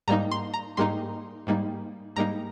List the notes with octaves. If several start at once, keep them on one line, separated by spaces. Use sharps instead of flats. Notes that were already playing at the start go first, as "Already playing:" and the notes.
G#2 G3 A#3 D#4 A#5
C6
A#5
G#2 G3 A#3 D#4 C6
G#2 G3 A#3 D#4
G#2 G3 A#3 D#4 A#5